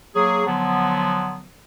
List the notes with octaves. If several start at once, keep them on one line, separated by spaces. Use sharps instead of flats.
F#3 A#3 G#4
D3 F3 F#3 B3